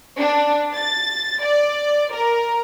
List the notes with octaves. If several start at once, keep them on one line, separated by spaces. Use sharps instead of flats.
D4
A6
D5
A#4